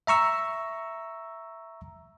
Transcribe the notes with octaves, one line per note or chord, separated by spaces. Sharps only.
E5 A#5 C#6 E6